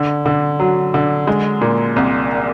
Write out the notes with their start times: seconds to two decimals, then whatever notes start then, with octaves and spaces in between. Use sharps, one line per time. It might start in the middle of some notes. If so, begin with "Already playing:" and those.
Already playing: D3
0.26 D3
0.60 F#3
0.94 D3
1.27 G#3
1.61 A#2
1.96 C2